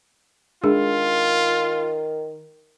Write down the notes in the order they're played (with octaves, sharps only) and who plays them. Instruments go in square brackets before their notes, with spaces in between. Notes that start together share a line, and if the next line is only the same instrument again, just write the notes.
[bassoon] D#3 [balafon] G#3 D4 G#4 [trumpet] F4